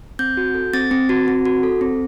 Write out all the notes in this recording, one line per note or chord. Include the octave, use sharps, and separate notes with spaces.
C4 G6
F#4
A4
C4 A6
C4
F#4
C4
F#4
A4
C4